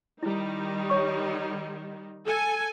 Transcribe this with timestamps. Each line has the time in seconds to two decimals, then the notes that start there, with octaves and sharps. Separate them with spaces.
0.23 D#3 G3 D#4 E4
0.90 C#5 C#6
2.24 A4 G#5